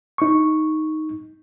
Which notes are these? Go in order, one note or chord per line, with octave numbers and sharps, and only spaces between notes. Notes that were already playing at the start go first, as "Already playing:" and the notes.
D#4 C#6